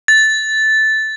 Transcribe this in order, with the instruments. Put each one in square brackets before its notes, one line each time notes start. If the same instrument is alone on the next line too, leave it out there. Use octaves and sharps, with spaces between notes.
[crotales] A6